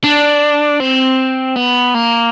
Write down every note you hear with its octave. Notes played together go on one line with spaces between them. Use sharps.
D4
C4
B3
A#3